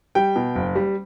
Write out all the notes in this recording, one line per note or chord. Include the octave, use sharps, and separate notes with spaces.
G3 G5
B2
F#1
G3